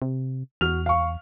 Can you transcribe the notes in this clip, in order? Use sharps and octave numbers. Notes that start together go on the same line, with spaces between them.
C3
E2 F#4 F6 F7
F5 C#6